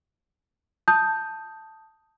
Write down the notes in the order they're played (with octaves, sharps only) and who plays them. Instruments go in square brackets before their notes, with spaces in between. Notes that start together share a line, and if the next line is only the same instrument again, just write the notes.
[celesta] A5 D#6 G6